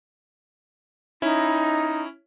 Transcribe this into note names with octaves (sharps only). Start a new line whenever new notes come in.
C#4 D#4 E4